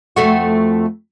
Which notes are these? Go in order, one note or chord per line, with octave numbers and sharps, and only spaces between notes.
F2 A3 F#4